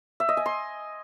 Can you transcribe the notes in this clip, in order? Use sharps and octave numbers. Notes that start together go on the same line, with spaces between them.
E5
D#5
G#5
C6